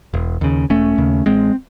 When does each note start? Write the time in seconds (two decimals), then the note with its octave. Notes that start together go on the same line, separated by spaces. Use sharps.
0.14 E1
0.41 D#2 C#3
0.70 E1 A3 C#4
0.98 D#2 C#3
1.26 A1 G#3 C4